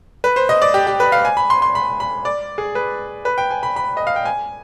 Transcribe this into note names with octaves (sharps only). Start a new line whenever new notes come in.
B4
C5
D#5
D5
G4
G4
B4
F5
G#5
B5
C6
C6
B5
B5
D5
G#4
B4
B4
G5
G#5
B5
B5
D#5
F5
G5
G#5